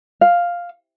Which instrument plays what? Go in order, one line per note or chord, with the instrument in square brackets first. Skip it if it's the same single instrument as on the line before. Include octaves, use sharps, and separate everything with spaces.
[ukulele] F5